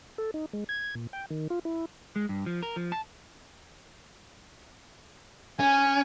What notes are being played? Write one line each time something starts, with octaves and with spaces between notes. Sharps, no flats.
A4
D#4
G#3
G#6
A#2
G5
D#3
F4
E4
G#3
G2
F3
A#4
F3
A5
C#4 G#5